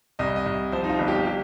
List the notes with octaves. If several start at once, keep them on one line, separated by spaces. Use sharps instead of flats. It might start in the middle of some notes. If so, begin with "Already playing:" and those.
C2 D#5
D#5
C2
F3 C5
D#4
F4
G1
G4
G4